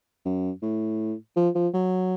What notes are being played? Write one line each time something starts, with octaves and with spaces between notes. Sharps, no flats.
F#2
A2
F3
F3
F#3